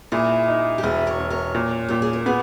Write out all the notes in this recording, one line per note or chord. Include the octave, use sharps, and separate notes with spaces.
A#2 E4 G#4
D#4
G4
E1 E4 G#4
A#4 C#5
E1
A#4 C#5
A#2
A#2 G4
G#4
A#4
B3 G#4 B4